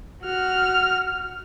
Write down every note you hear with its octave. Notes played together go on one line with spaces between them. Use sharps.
F#4 F6